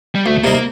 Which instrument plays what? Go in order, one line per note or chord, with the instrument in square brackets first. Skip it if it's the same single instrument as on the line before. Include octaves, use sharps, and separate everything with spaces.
[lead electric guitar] G3
[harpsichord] D2 [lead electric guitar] A3
[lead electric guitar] A3
[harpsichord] C3 G3 C4 D#4 [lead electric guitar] A#3
[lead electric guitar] A#3